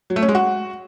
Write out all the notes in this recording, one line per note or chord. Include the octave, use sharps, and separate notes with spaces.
F#3
A3
C#4
G#3
F#4